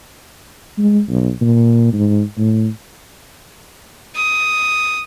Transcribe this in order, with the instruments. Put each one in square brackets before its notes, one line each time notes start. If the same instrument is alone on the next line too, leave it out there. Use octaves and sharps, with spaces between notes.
[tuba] G#3
B1
A#2
G#2
A2
[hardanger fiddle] D#6